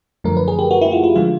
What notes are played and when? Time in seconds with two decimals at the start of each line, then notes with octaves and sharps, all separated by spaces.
0.24 F#2 D3 F3 A3 A#4
0.37 B4
0.48 G#4
0.59 G4
0.71 F#4
0.81 E4
0.92 F4
1.04 F4
1.16 D3 F3 G#3 F4